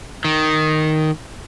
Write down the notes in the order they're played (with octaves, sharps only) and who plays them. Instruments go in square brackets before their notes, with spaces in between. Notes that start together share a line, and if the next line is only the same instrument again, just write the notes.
[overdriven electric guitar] D#3